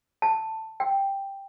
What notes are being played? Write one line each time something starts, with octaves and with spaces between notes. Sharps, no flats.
A5
G5